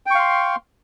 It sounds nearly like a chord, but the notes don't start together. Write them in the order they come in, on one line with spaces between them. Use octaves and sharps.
G5 C#6 F5 C6